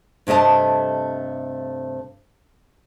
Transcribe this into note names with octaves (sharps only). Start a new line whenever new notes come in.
G2 C3 A3 D#5 A5